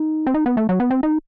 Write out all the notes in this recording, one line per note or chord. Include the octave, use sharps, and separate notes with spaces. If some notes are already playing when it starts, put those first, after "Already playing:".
Already playing: D#4
C4
D#4
B3
A3
F#3
B3
C4
D#4